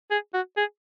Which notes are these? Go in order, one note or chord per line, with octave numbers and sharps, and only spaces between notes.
G#4
F#4
G#4